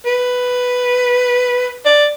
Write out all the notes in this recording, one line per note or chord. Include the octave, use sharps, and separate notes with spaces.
B4
D5